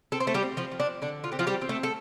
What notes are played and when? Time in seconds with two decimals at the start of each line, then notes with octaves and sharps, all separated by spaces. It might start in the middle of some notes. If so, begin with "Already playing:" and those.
0.12 C4 A4
0.20 C5
0.27 A3 A4
0.34 G3 G4
0.43 C4
0.57 F3 F4
0.72 F3
0.80 D4
1.02 D3 D4
1.24 F4
1.32 C4 G4
1.39 F3 F4
1.47 G3 G4
1.62 C4
1.69 A3 A4
1.83 A4